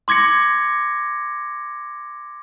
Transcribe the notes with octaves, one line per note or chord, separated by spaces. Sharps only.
C6 D6 G#6 A#6 C#7